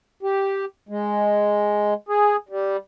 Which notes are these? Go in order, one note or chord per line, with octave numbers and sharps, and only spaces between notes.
G4
G#3
G#4
G3